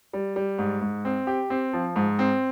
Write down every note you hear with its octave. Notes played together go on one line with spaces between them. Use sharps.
G3
G3
G#2
G#2
C4
G4
C4
F3
G#2
C4